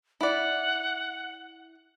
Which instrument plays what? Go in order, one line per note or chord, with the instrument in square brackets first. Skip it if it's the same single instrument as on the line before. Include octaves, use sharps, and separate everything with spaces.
[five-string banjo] E4 D5 [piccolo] F#5